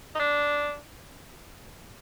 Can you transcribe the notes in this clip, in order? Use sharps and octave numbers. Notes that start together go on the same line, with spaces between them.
D#4
D4